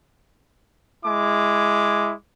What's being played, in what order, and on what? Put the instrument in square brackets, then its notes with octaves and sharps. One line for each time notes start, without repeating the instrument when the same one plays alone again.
[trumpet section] G#3 E4 D6